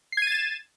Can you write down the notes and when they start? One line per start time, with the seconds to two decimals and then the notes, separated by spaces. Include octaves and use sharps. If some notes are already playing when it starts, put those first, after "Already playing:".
0.12 C7
0.17 G#6
0.22 D#7
0.27 A6
0.32 E7